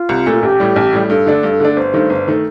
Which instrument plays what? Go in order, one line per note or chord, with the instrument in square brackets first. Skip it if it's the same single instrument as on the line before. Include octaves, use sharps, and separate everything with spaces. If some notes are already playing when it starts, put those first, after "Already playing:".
Already playing: [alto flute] F4
[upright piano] C2
A#2 A3
[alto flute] F4
[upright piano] A1 [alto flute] G4
[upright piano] A2 G3
A1
A2 G3
[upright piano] G2 [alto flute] A4
[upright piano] D3 A3 D4
G2
D3 A3 D4
[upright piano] G1 [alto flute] C5
[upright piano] G2 D#3 A3
G1
D#3 A3